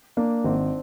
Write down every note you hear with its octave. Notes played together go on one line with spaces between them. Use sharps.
A#3 D4
G#1 C4